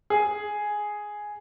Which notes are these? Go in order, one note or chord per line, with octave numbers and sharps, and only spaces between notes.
G#4